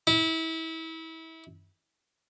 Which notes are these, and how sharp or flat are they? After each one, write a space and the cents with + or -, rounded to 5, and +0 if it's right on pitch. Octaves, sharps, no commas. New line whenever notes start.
E4 -30